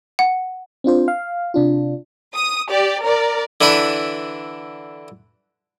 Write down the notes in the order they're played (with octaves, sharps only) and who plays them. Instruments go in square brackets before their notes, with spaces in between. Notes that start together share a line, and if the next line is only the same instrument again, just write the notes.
[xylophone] F#5
[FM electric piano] C4 D4 F4 C5
F5
C3 D4 F4
[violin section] D#6
G4 D5
A#4 D5
[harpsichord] D3 E3 D4 B4